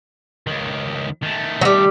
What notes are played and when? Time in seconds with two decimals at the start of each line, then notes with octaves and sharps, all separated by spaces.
0.47 C#2 D#3
1.23 D#3 A3
1.61 F#3 G3